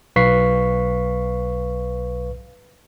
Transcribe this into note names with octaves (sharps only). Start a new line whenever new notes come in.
B1 B4 F5 C#6 B6 C7